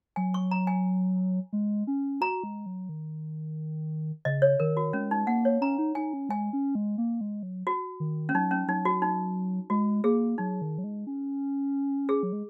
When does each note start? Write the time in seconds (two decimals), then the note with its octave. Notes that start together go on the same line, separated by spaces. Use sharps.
0.16 F#3 G#5
0.34 C#6
0.51 A#5
0.67 G#5
1.53 G#3
1.87 C#4
2.21 F#4 A#5
2.44 G#3
2.66 F#3
2.89 D#3
4.25 C#3 D#5
4.42 C#5
4.60 D#3 A#4
4.77 F#4
4.93 G#3 C#4
5.11 D#4
5.27 A#3 F#5
5.45 C#5
5.61 C#4 A#5
5.78 D#4
5.95 D#4 G#5
6.13 C#4
6.29 G#3 G#5
6.53 C#4
6.75 G#3
6.98 A#3
7.21 G#3
7.43 F#3
7.67 F#4
8.00 D#3
8.29 C#4
8.34 F#3 D#4
8.51 C#4
8.68 F#3 D#4
8.85 F#4
9.02 D#4
9.70 G#3 F#4
10.04 A#3 G#4
10.38 F#3 D#4
10.62 D#3
10.78 F#3
10.84 G#3
11.07 C#4
12.09 G#4
12.23 F#3
12.33 G#3